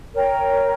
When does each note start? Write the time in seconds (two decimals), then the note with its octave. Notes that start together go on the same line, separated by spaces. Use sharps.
0.14 A#4 C#5 G5 A#5